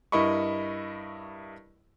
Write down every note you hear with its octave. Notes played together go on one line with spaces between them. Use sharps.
G2 E4 A#4 D#5 B5 C#6